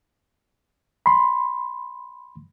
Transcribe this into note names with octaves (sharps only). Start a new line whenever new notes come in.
B5 C6